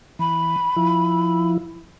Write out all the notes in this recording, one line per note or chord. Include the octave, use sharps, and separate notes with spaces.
E3 B5
F3 E4